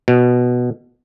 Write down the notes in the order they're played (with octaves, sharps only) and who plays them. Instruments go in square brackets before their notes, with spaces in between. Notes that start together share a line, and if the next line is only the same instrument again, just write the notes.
[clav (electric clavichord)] B2